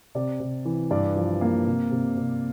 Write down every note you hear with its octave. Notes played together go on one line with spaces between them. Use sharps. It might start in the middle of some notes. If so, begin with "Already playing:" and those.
C3 D5
C3
E3
G2 D5
F3
A#3
C3
C3
C3